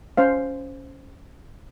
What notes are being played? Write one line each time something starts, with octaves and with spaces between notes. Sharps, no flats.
C#4 C5 F5